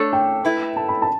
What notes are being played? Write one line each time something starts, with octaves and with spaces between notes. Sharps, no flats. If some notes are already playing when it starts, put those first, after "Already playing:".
Already playing: A3 D4 A4 C#5
G5
A3 E4 B4
A5
B5
A5